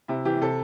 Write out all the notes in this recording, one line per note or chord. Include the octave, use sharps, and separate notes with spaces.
C3 E4
E3 G4
C3 A4